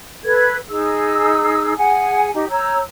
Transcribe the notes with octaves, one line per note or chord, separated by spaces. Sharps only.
A4 B4 G#6
D#4 G#4 E6
G#4 F#5 G#5
D#4 G4
C#5 A#5 E6 G6